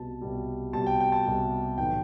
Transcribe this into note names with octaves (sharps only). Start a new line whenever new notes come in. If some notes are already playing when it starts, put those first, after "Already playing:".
Already playing: C2 B2 G3 A5
C2 B2 G3
C2 B2 G3 A5
G5
G5
A5
C2 B2 G3
B1 A2 E3 G5